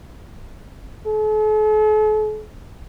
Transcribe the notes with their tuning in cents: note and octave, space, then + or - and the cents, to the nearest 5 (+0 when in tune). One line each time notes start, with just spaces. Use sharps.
A4 -45